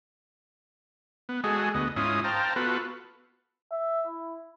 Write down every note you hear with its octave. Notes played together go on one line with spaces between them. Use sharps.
B3
G#3 F#4 G#4 A4 D#5
D2 B3 D#5
G#2 C#4 E4 F4 D#5 D#6
C5 F5 G5 A5 A#5
B3 F4 F#4 A4 B4
E5
E4